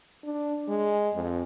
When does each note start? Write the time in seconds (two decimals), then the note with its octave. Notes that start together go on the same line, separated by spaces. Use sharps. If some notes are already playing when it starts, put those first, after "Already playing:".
0.25 D4
0.68 G#3
1.14 F2